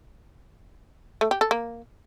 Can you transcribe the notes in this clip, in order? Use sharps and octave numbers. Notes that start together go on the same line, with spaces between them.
A3
G4
A4
A#3